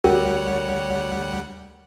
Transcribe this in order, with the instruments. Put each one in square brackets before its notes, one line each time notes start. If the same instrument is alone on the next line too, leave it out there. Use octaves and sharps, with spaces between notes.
[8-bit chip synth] D2 G3 F#5 [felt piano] F#4 G4 [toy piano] A#4 [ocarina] C#5